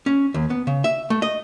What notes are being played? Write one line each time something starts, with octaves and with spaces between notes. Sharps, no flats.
C#4
D#2
B3
C#3
E5
A3
D#5